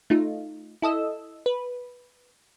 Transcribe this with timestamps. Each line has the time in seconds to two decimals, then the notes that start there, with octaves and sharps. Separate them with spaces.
0.10 A3 D#4 F4
0.82 E4 A4 D#5 E6
1.46 B4